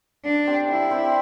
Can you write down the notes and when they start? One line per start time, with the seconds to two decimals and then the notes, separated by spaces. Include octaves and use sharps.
0.24 D3 D4
0.47 C4 G4 C5
0.68 D3 E4
0.90 C4 G4 C5